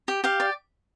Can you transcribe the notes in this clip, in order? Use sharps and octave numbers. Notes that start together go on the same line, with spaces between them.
G4
G4 F5
D5